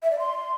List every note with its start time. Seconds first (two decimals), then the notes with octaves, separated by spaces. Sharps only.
0.03 E5
0.11 D5
0.19 C6